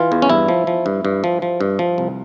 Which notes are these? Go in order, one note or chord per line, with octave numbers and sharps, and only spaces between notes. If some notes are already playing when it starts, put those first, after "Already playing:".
Already playing: E3 F4
E2
C#4
G2 E4
F3
F3
G2
G2
F3
F3
G2
F3
C2